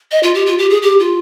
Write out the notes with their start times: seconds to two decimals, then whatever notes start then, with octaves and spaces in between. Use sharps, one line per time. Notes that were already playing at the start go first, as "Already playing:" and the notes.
0.11 D#5
0.23 F4
0.35 G4
0.46 F4
0.59 G4
0.70 G#4
0.82 G4
1.00 F4